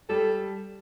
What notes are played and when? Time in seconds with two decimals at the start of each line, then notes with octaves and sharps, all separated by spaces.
0.09 G3 A4